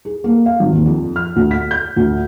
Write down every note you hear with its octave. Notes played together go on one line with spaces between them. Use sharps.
G#4
A#3
F5
G#1
D#2
F2
F6
D2
B6
G6
D2